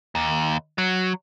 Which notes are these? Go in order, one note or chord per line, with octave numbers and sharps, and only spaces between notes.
D#2
F#3